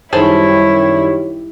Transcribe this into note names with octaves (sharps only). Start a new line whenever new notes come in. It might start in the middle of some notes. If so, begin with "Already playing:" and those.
F#2 D#3 G3 E4 G#4 A4 C5 C#5